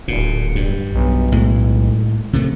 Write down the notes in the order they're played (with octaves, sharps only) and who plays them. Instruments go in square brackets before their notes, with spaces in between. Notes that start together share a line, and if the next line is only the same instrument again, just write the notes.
[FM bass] D1 [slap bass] A#2
[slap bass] G2
[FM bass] B1
[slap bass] A2 G#3
C3 D#3 A3